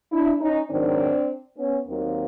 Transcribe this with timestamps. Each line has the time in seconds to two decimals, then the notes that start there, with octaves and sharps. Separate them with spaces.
0.12 D4 E4
0.41 C#4 D#4
0.70 G#2 D#3 F#3 C4 D4
1.57 B3 C#4
1.87 D#2 D#3 F#3 A#3 C4